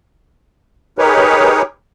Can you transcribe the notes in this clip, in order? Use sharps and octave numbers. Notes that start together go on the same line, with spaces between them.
D#4 G4 G#4 A#4 B4 C#5